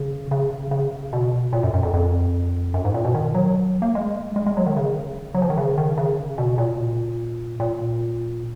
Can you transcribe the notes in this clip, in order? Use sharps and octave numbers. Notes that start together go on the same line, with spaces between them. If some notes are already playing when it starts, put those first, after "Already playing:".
Already playing: C#3
C#3
C#3
B2
A#2
F#2
F#2
F2
F2
F#2
G#2
A#2
B2
D#3
F#3
A#3
G#3
G#3
G#3
F#3
D#3
C#3
F#3
F3
D#3
C#3
D#3
C#3
B2
A#2
A#2